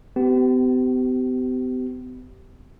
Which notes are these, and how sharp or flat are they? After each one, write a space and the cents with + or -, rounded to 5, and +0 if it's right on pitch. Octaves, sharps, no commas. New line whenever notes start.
B3 +45 G4 -30